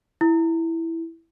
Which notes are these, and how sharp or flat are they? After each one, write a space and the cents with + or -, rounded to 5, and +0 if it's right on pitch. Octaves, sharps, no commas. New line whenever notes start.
E4 +0